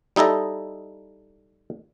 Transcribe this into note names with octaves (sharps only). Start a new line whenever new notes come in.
G3 D#4 E4 A4 D#5